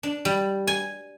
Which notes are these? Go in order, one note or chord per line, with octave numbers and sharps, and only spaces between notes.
D4
G3
G#5